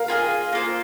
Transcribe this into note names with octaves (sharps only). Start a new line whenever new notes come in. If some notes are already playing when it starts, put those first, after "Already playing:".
Already playing: A#4 F5
F4 G#4 D#5 G#5
A#3 F4 C5